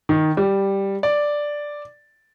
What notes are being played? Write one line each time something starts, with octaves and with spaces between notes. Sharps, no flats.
D#3
G3
D5